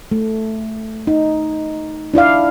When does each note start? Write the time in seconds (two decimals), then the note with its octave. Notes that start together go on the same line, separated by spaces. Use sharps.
0.12 A3
1.07 D#4
2.14 D4 E4 D5 F5